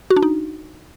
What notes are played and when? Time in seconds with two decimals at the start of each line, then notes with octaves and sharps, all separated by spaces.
0.10 F#4
0.16 D4
0.23 D#4